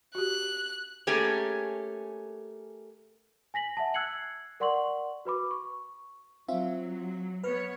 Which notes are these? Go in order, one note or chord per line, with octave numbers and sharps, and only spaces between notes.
F#4 G4 F#6
A3 A#3 C#4 G4 G#4
G#5 A#6 B6 F#7
E5 F#5 A5
E6 F#6 G#6 C7 C#7 F#7
A#4 D5 F#5 C6 C#6 F#7
F#4 B4 B5 D6
C#6
F#3 C4 F4 E5
B3 B4 C#5 F6